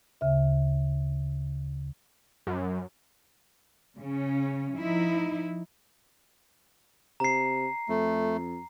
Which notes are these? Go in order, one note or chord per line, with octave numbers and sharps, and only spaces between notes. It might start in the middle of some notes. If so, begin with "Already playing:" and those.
D2 C#3 E5
F#2
C#3 C#4
F3 D#4 E4
C3 A#5 C7
F2 A3